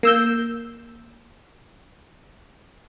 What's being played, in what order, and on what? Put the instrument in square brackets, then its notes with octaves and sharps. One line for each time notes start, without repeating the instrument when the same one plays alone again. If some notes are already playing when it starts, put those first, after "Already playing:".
[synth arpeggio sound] A#3 E6 G6